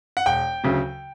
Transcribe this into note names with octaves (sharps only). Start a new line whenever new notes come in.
F#5
E1 G5
D2 C#3 F#3